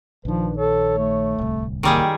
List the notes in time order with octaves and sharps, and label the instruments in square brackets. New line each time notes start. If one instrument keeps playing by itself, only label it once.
[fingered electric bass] A#1 D#3 [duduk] F3 [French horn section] D4 B4
[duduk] A4 [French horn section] C#5
[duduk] A3
[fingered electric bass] D1 C2
[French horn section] F#2 [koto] D#3 G3 G#4 [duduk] A#3